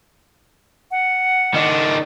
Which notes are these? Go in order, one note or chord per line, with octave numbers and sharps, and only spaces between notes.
F#5
D#3 D4